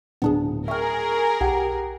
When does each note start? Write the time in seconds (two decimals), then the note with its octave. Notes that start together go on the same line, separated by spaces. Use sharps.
0.22 D1 B3 D4 G#4
0.68 G#4 A#4 E5 G5 C#6 F6
1.41 B1 G4 F#5 G5